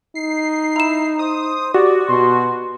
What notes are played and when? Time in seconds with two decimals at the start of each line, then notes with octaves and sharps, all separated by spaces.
0.15 D#4 C7
0.76 E4 A#5 E7
1.19 C5 D#6
1.74 F#4 G4 D5
2.09 B2 C6